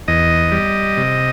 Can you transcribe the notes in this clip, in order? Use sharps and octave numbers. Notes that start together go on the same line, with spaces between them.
E2 D#5
G3
C3